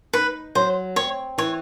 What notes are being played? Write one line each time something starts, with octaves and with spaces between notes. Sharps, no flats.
D#4 B4
F#3 C5
C4 C#5
E3 C#5